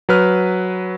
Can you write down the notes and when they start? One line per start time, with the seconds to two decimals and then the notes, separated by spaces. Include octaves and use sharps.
0.09 F#3 B4 F6